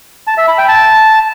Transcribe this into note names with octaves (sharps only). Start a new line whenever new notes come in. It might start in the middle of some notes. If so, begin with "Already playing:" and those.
A5
E5
B5
G5
A5